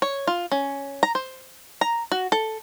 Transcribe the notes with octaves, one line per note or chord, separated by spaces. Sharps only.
C#5
F4
C#4
A#5
C5
A#5
F#4
A4